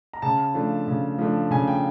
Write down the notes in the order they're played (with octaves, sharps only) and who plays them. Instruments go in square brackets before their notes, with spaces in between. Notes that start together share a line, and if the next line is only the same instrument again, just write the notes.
[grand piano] A#5
C#3 A5
F3 A3 D4 F4
C#3
F3 A3 D4 F4
C#3 G#5
G5